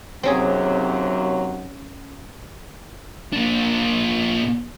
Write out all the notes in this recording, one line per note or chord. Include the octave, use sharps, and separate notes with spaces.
D#2 C3 F#3 C4 C#4 G#4
A#2 D4